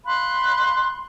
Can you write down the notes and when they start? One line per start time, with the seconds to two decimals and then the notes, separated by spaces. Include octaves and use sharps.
0.06 F5 B5 C6 F#6